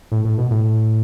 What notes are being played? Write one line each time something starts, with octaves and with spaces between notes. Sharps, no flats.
A2
A2
B2
A2